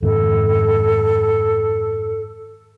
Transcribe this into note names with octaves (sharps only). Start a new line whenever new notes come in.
F2 G#2 D#3 A4